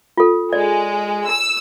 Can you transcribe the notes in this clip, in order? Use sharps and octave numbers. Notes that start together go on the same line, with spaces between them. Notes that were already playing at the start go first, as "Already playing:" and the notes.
F4 A4
G#3 D5
E6